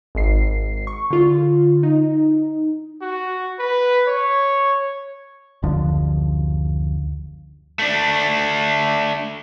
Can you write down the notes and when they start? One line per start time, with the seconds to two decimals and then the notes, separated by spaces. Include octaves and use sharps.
0.15 G#1 C7
0.87 C#6
1.10 D3 F4
1.83 D#4
3.02 F#4
3.59 B4
4.08 C#5
5.63 F#1 D2 D3 F3
7.79 A3 D4